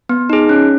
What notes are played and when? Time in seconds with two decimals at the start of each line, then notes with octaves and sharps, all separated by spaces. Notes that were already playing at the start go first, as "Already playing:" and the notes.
0.09 B3
0.30 D#4 G#4
0.49 C#4